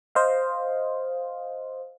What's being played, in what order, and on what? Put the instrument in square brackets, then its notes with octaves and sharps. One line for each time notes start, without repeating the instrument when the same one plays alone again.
[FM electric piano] C5 D#5 F5